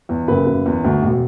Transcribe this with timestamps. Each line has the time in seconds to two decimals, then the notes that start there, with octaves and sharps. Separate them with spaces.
0.09 E2
0.28 F#1 B4
0.47 F#1
0.66 E2
0.84 D2
1.02 E1